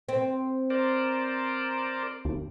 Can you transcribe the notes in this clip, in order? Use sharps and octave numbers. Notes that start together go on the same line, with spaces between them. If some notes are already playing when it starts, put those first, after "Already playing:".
C4
A#4 C5 D5
D2